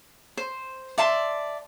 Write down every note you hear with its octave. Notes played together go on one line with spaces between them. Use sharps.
C5
D5 E5 A5 C6